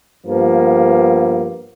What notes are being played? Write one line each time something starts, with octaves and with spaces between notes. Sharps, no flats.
G2 F3 A#3 B3